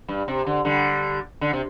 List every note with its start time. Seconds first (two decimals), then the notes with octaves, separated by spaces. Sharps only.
0.08 G2
0.28 C3
0.46 D3
0.65 D3 G3
1.41 D3
1.53 C3